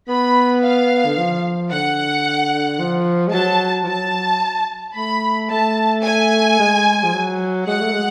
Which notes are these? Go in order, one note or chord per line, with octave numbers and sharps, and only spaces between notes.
B3 B5
F5
D3
F3
D3 F#5
F3
G#3
F#3 A5
F3
F#3 A5
A3 B5
A3 A5
G#5
G#3
F3
F#3
G#3 F#5
A3
G#3